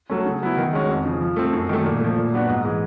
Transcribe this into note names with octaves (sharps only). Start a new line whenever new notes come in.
F#3 A3 C#4
C#3
F#3 B3 E4
D#3
G#3 C#4 F#4
F2
C#3 F3
F3
A3 C4
F#2
D#3 F#3 A3
A#2
F3 A3
A#2
F#3 B3 D4 F#4
G#2
E3 G#3